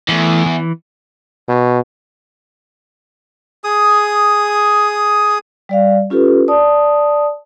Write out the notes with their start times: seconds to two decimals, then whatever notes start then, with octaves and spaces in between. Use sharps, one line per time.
0.09 E2 E3 A3
0.46 E3
1.49 B2
3.64 G#4 D#6
5.69 G3 D5 F5
6.10 C#4 F4 G4 A4 B4
6.48 D5 A5 D#6